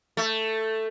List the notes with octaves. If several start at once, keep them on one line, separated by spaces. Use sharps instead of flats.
A3